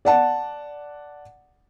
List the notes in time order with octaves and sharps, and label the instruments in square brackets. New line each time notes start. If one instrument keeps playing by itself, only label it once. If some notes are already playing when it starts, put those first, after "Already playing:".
[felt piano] D5 F#5 A5